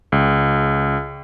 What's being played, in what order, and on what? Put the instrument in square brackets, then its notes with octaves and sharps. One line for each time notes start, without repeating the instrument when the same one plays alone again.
[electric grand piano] C#2